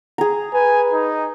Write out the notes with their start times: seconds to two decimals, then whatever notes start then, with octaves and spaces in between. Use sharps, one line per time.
0.18 G#4 A#5
0.54 B4 G#5
0.93 D#4